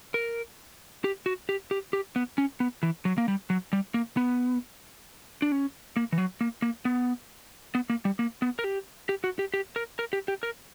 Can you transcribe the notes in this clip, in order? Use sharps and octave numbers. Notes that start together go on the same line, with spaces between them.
A#4
G4
F#4
G4
G4
G4
B3
C#4
B3
E3
F#3
A#3
G3
F#3
G3
A#3
B3
D4
C#4
A#3
E3
F#3
A#3
A#3
B3
B3
A#3
G3
A#3
B3
A#4
G4
G4
F#4
G4
G4
A#4
A#4
G4
G4
A#4